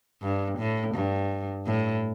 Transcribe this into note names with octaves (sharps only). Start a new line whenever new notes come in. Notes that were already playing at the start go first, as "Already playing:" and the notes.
G2
A2
G2
A2